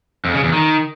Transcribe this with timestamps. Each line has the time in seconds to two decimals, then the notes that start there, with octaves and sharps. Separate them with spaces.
0.25 F2
0.34 C#3
0.44 E2
0.53 D#3